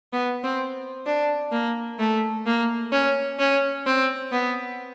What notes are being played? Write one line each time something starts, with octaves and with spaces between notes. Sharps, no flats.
B3
C4
D4
A#3
A3
A#3
C#4
C#4
C4
B3